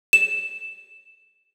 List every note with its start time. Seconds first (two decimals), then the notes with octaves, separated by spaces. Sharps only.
0.13 E7